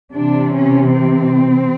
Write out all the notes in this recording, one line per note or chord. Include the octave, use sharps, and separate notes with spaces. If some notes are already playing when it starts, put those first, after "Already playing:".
C3 E3 D4
C#4
C4